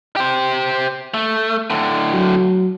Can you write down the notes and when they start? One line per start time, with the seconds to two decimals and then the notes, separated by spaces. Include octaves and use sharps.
0.16 G4 C5
1.14 A3
1.70 A2 D3
2.14 F#3